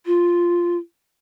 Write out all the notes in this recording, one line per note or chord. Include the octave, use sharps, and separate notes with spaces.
F4